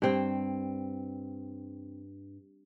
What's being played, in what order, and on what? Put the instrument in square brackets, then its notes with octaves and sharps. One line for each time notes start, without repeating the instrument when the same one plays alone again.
[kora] G2 C4 G5